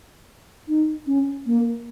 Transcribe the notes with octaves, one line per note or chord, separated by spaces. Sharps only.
D#4
C#4
A#3